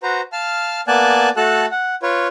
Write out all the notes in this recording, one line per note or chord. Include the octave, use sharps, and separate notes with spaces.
F#4 B4 C5 A#5
F5 A5 F6
A#3 B3 D5 G#5 A5 F#6
A3 F#4 A4 A5 F#6
F#5
F4 B4 C#5